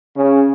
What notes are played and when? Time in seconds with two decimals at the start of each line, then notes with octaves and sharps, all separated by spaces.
0.16 C#3